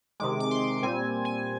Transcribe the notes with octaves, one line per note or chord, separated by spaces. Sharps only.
C3 D#3 G#3 D6
D6
C6
A#2 G3 C4 G#5
G#5